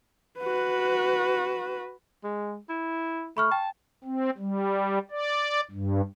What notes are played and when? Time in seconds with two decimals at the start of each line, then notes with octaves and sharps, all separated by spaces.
0.40 F#4 B4
2.24 G#3
2.69 E4
3.37 A3 B5 C#6 F6
3.52 G5 A5
4.04 C4
4.38 G3
5.11 D5
5.71 G2